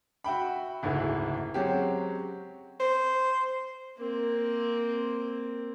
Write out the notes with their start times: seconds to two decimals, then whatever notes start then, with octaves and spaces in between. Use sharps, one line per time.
0.24 F#4 E5 G5 B5
0.83 F#1 D2 G#2 E4 G#4
1.54 F#3 G#3 C4 C#4 F#4 G4
2.80 C5
3.97 A#3 C4